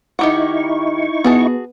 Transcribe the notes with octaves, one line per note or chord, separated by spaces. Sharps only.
D#3 D#4 E4 G4 F#5 C#6
B3 F#4 G#4 A5